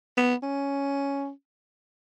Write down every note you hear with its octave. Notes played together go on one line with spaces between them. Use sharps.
B3
C#4